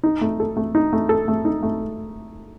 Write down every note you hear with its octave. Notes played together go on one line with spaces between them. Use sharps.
D#4
A3
A4
A3
D#4
A3
A4
A3
D#4
A3